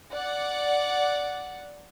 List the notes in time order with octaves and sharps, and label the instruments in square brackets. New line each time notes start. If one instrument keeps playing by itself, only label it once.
[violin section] D5 F#5